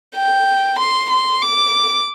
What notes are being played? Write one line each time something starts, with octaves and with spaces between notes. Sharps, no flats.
G5
C6
C6
D6